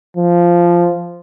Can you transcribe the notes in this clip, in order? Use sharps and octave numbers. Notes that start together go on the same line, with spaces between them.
F3